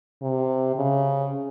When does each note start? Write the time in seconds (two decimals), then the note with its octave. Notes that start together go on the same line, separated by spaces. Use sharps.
0.22 C3
0.76 C#3